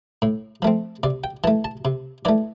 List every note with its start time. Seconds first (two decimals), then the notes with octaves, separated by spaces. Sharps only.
0.22 A2
0.62 F3 A3 C4
1.03 C3 D5
1.24 G5
1.44 E3 A3 A5
1.64 A5
1.85 C3
2.25 E3 A3 D5